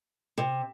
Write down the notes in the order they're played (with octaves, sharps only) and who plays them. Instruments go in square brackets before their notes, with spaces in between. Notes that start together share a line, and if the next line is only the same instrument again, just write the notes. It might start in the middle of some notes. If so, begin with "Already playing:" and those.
[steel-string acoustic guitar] C3